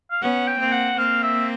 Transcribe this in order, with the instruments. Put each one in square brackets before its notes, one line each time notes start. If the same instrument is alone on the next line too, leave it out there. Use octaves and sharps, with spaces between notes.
[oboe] F5
[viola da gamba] B3 C#4 [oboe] F#5
[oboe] G5
[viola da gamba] A#3 C4
[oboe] F#5
[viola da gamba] A#3 C4 [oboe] F5
[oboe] E5